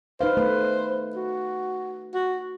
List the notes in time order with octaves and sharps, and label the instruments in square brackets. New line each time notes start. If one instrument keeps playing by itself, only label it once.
[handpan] D#4 B4 F5 [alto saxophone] C5
[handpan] A3 B4
[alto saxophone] F#4
F#4